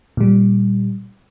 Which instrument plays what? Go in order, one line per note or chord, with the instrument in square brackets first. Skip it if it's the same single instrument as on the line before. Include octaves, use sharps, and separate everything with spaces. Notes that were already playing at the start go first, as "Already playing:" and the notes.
[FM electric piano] A#2 G3